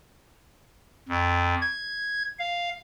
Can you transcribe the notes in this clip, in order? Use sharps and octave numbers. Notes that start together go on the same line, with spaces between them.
F2
G#6
F5